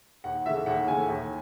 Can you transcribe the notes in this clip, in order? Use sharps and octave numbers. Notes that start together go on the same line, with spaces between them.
D#2 F#5
C#3 E3 A3 E5
D#2 F#5
C#3 E3 A3 G#5
D#2